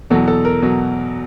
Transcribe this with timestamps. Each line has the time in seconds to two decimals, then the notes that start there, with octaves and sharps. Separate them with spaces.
0.10 E2 B2 F#3 A4
0.28 A4
0.45 A#4
0.62 B2 F#3